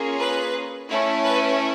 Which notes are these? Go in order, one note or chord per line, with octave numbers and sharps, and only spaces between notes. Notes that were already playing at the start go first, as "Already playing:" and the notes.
Already playing: A#3 C#4 F4 G#4
B4
A3 C#4 E4
B4